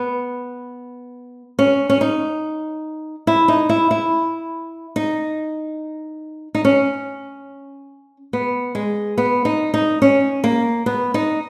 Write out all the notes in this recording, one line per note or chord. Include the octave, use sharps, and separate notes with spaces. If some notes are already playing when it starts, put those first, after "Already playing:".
Already playing: B3
C#4
C#4
D#4
E4
D#4
E4
E4
D#4
D#4
C#4
B3
G#3
B3
D#4
D#4
C#4
A#3
B3
D#4